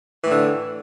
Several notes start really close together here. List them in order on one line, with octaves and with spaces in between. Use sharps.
E3 A2 D3